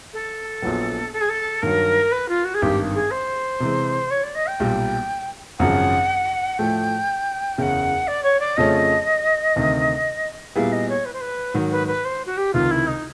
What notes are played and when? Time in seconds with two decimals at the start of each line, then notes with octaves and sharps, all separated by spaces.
0.13 A4
0.62 A#1 A#2 F#3 B3
1.13 A4
1.21 G#4
1.29 A4
1.62 G2 D#3 F#3 A#4
2.12 B4
2.28 F4
2.44 F#4
2.54 G#4
2.62 G#1 G2 D#3 G4
2.94 G#4
3.11 C5
3.60 C3 E3 G#3
4.10 C#5
4.23 D5
4.35 D#5
4.48 G5
4.60 B1 A#2 G3
5.59 G#1 F#2 C#3 F3 F#5
6.58 A2 F3 A3 G5
7.57 F#1 E2 C#3 F#5 G5
8.07 D5
8.23 C#5
8.40 D5
8.56 F2 C#3 F3 A3 C#4 D#5
9.56 D2 C3 D#3
10.56 A#2 G3 B3 E4 G#4 F5
10.72 D#5
10.89 C#5
11.05 B4
11.13 C5
11.21 B4
11.54 G#2 D#3 F#3
11.71 B4
11.87 B4
12.05 C5
12.26 F#4
12.37 G4
12.53 C#2 C3 D#3 F4
12.71 E4
12.87 D#4